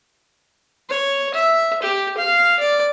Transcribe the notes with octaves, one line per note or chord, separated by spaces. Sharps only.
C#5
E5
G4
F5
D5